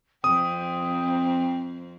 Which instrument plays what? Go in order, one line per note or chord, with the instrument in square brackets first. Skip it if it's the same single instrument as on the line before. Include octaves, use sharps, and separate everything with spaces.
[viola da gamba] F2 C4 [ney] G5 [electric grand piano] D#6